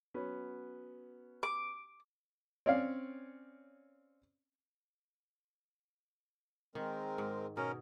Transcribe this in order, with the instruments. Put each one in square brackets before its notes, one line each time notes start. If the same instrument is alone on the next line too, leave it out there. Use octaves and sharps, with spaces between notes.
[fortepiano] F#3 B3 C#4
[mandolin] D6
[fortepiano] C4 C#4 C#5 D5 F5
[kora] D#3 [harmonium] G#3 C4 A#4
[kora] G#2
[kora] B2 [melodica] C#4 A#4